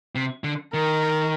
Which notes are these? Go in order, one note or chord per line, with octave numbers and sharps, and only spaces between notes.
C3
D3
D#3 A#4